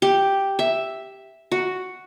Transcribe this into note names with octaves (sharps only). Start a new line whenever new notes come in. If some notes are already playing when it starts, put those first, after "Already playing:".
G4
E5
F#4